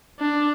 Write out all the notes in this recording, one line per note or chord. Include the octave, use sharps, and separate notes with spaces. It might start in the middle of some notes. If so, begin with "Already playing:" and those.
D4